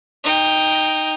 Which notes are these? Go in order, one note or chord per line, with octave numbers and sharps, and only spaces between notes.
D#4 G5